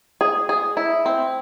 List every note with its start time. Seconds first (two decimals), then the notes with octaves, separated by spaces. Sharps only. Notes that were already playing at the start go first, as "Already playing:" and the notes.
0.21 G#4
0.49 G#4
0.77 E4
1.06 C4